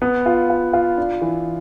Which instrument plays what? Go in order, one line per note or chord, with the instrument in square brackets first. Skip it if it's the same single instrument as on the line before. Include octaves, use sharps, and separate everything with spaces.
[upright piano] B3
F4
F4
F4
D4
E3